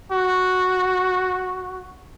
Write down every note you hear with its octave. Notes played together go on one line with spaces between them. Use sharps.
F#4